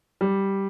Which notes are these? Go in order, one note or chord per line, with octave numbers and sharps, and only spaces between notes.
G3